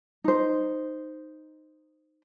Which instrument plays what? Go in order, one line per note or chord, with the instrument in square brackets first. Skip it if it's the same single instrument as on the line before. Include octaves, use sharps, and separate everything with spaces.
[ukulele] D#4 C5